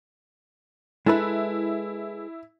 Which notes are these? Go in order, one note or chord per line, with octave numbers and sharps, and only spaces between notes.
G#3 E4 A4 B4